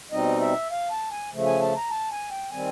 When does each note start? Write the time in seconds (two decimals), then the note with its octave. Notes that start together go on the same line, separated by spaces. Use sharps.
0.11 B2 G3 C4 D#4 D#5
0.41 E5
0.71 F5
0.91 A5
1.11 G#5
1.32 C#3 F3 A3
1.46 G#5
1.61 A5
1.77 A#5
1.91 A5
2.11 G#5
2.31 G5
2.52 D#3 G3 C4 G#5